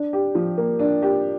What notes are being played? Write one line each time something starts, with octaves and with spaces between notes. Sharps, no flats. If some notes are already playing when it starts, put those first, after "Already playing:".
Already playing: D4
G4
F3
A#3
D4
G4